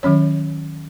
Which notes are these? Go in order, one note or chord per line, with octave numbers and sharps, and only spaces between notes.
D#3 F#3 C#4 C#5